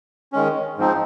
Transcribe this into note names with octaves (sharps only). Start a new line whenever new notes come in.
D#3 G#3 C#4
G#2 F3 C4 D#4